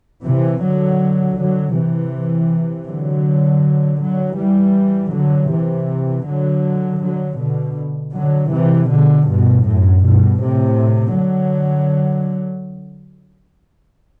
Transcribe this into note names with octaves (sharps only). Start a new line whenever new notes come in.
C3 E3
D3 F#3
D3 F#3
C3 E3
D3 F#3
D3 F#3
E3 G3
D3 F#3
C3 E3
D3 F#3
D3 F#3
B2 D3
D3 F#3
C3 E3
B2 D3
G2 B2
F#2 A2
G2 B2
A2 C3
D3 F#3